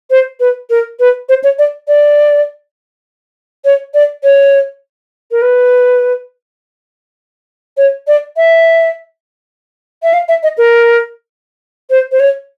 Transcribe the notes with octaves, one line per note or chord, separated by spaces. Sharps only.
C5
B4
A#4
B4
C5
C#5
D5
D5
C#5
D5
C#5
A#4
B4
C#5
D5
E5
E5
F5
E5
D#5
A#4
C5
C5
C#5